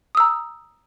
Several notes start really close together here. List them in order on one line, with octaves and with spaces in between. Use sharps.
D#6 E6 A#5